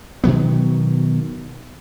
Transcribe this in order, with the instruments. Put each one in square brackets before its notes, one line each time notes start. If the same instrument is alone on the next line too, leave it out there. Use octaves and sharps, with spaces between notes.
[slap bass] B2 D#3 F#3 B3